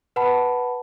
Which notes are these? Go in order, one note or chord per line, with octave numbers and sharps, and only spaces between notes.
B4 F#5 A5 B5